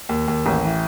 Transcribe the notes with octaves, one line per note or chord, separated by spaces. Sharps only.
D#2
D#2
A1
E3